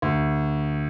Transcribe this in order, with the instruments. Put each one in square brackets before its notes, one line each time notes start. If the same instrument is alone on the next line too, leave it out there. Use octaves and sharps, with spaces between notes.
[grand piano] D2